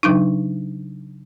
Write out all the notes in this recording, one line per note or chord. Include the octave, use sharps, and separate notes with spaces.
C#3 F#3 D4 D#4